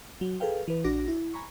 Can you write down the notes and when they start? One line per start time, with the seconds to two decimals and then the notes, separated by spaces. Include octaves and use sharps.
0.21 F#3
0.40 G#4 A4 B4 F5 G5
0.68 E3 B4
0.84 A#1 D4 F#4 D6 A#6
1.08 E4
1.34 G#5 A#5 B5 C#6